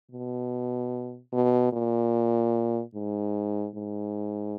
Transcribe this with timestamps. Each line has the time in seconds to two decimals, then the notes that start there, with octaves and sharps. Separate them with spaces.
0.11 B2
1.33 B2
1.73 A#2
2.95 G#2
3.75 G#2